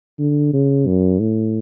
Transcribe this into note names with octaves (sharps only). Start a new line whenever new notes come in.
D3
C#3
F#2
A2